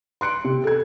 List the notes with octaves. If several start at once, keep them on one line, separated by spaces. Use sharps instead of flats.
C6 F#6 C#7 D7
C3
A4 G#6